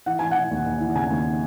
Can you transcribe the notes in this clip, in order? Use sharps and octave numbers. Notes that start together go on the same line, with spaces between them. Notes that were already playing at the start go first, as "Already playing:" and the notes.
E3 F#5
E3 G#5
E3 F#5
D#2
D#2
E3
C#3 G#5
D#2